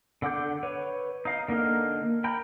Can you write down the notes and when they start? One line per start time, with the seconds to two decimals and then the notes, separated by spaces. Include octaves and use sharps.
0.22 D3 F#5 D6 G6
0.63 B4 C#5
1.25 D#4 F5
1.48 D3 A#3 D#4 F5
2.24 G5 A#5 B5 G6